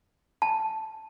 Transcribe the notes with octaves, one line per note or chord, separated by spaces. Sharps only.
A5